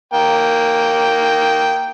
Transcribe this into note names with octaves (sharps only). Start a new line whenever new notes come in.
A#3 G5